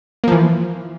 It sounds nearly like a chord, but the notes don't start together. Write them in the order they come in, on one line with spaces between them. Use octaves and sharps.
A#3 F3 E3